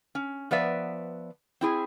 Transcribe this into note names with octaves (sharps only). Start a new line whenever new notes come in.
C#4
F3 B3 B4 D5 E5
C4 E4 G#4